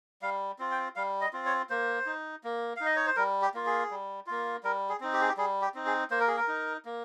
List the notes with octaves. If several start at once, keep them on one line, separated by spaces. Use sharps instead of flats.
G3 F5
C4 F4
G5
G3 F5
D#5
C4 F4
C#5
A#3 C5
D#4
A#3
D#4 F5
D#5
C#5
C5
G3 A#4
G4
A#3 F4
G#4
G3
A#3 F4
G3 A#4
G#4
C4 D#4
G4
G#4
G4
G3 G#4
G4
C4 D#4
G#4
A#3 C5
A#4
G#4
A#4
D#4
A#3